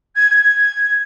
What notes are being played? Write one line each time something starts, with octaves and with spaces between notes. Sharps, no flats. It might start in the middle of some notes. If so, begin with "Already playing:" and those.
G#6
G#6